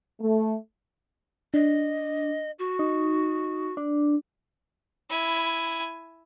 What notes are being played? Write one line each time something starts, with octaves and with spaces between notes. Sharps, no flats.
A3
D4 D#5
F#4
D#4
D4
E4 G#5